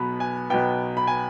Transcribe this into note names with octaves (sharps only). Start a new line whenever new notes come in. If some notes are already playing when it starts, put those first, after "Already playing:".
Already playing: B1 B2 B3 B5
G#5
B1 B2 B3 G5
B5
G#5